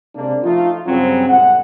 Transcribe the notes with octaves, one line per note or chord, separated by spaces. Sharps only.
C3 G#3 A#3 D4
F3 A3 D#4 F4
G2 C#3 F#3 C4
G1 A#2 G#3 F#5